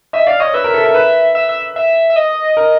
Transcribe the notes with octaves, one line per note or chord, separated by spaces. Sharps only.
D#5 E5
D5 F5
C#5 D#5
B4 E5
A#4
A4
A#4
B4
E5
E5
E5
E5
D#5
A#4